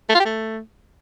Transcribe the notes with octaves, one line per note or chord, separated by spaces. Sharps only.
A3
F4
G4
A3